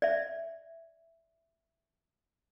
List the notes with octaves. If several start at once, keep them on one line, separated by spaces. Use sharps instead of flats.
D5 E5